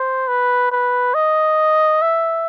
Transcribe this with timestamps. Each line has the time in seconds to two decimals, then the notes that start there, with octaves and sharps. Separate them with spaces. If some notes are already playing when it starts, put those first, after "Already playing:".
Already playing: C5
0.28 B4
0.71 B4
1.14 D#5
2.02 E5